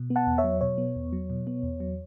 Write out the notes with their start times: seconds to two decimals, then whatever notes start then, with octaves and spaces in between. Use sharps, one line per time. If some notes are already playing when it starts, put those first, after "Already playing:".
Already playing: B2
0.10 B3
0.16 F#5 A5
0.27 E2
0.38 C#5 E5
0.44 F#3
0.61 B2 C#5
0.78 B3
0.96 E2
1.13 F#3
1.30 B2
1.47 B3
1.63 E2
1.80 F#3